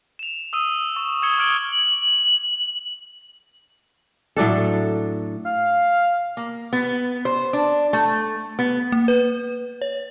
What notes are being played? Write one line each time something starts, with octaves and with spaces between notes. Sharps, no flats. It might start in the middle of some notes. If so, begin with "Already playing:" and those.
E7 F7
D#6 E6 D#7
C#6
C#6 D#6 E6 G#6 C#7 G7
D6 F6 G#6 D7 F#7 G7
F#7
A2 F#3 D4 A4
F5
A#3
B3
C5
D4
A3
B3
A#3
B4
C#5